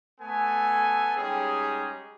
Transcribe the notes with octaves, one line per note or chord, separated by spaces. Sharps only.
A3 B3 A4 G#5
G3 G#3 C#4 D#4 G4 G#4